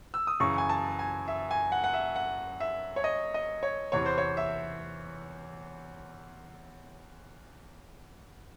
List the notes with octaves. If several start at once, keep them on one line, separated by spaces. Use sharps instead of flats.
E6
D#6
F#2 C#3 E3 C#6
G#5
A5
G#5
E5
G#5
F#5
F#5
E5
F#5
E5
C#5
D#5
D#5
C#5
E2 C3 E3 C#5
C5
C#5
E5